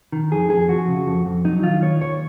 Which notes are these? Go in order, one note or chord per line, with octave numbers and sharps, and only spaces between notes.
D#3
F2 G#4
F2 G#4
F3 F#4
C#3
F2
F2
F#3 D#4
D#3 F4
D#2 C#5
D#2 C#5